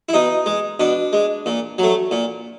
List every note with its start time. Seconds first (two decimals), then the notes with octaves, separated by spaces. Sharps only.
0.09 E4
0.13 B2 D#4
0.46 G#3
0.80 B2 D4
1.13 G#3
1.46 A#2
1.78 F#3 A3
2.11 A#2